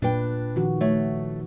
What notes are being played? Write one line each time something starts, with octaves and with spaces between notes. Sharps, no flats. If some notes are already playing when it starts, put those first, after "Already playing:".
A#2 D4 B4 G5
D#3 F3 F#4
A3 C#5